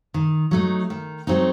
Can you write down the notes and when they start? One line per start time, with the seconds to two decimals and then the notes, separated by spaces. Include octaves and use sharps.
0.14 D#3
0.51 F#3 A3 C4 D#4
0.90 D#3
1.27 F#3 A3 C4 D#4